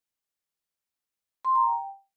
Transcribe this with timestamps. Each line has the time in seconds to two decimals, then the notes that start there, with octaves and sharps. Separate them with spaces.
1.45 C6
1.55 A#5
1.66 G5